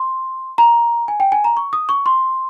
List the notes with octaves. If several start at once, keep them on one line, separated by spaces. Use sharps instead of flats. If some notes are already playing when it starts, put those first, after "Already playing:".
Already playing: C6
A#5
G#5
G5
G#5
A#5
C#6
D#6
C#6
C6